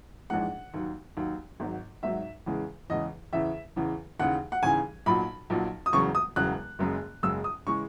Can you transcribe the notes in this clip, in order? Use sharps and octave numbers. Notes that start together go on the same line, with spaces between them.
A#1 G#2 E3 G#3 F#5
D#2 D#3 F#3
D#2 D#3 F#3
G#1 G#2 D#3 F#3
G#1 G#2 D#3 F#3 E5
E2 C#3 E3 G#3
E2 C#3 E3 G#3 D#5
E2 C#3 E3 E5
E2 C#3 E3
D#2 C#3 E3 F#5
F#5
D#2 C#3 E3 G#5
B1 A#2 F#3 B5
B1 A#2 F#3
D#6
E1 E2 C#3 F#3 C#6
D#6
E1 E2 C#3 F#3 F#6
F#1 F#2 C#3 G#3
F#1 F#2 C#3 G#3 E6
D#6
C#3 E3 G#3 C#6